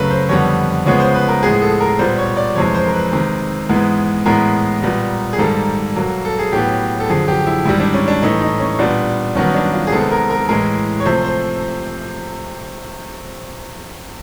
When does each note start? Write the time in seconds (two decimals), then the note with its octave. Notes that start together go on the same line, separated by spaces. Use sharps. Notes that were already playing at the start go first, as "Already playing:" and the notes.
Already playing: F#2 C#3 F#3 A3 A#4 B4
0.11 C5
0.29 F2 D3 G3 B3 C#5
0.85 C#3 F3 G#3 B3 C#5
1.00 C5
1.14 B4
1.28 A#4
1.43 A2 F3 G#3 B3 G#4
1.62 A4
1.81 A#4
1.99 A#2 G3 B3 C5
2.18 C#5
2.37 D5
2.56 F2 C3 E3 G#3 C#5
2.75 C5
2.86 A#4
2.93 B4
3.12 C3 D#3 G#3
3.69 G#2 E3 G#3 B3
4.26 A2 E3 G#3 B3 A#4
4.82 A#2 G3 B3
5.33 G#4
5.38 G#2 D#3 G3 A#3 A4
5.96 B2 F#3 A#3
6.25 A4
6.39 G#4
6.52 A2 F#3 B3 G4
7.00 A4
7.09 F#2 D3 F3 G#4
7.28 G4
7.47 E4
7.65 G#2 D#3 G3 E4
7.80 D4
7.94 C#4
8.08 D4
8.22 A2 E3 A3 D#4
8.41 D#4
8.60 C#4
8.79 A#2 G3 B3 D4
9.35 G2 D#3 F#3 B3 C#4
9.55 D4
9.73 F4
9.87 G#4
9.92 C3 D#3 G#3 B3 A4
10.11 A#4
10.30 A#4
10.49 A2 E3 G#3 A#4
11.00 C#5
11.05 C3 F3 A3 C5
11.24 C5